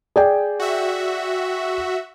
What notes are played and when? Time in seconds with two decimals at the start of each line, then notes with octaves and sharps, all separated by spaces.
0.16 G#4 D5 G5
0.60 F#4 E5